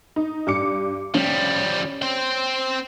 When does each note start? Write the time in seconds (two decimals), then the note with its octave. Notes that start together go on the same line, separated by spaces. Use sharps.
0.16 D#4
0.47 G2 D6 C#7
1.14 F3 G3 C#4
2.02 C4 G5